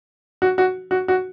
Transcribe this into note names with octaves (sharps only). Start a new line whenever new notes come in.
F#4
F#4
F#4
F#4